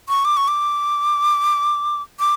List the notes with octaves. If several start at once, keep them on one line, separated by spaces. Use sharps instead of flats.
C#6
D6
C#6
D6
D6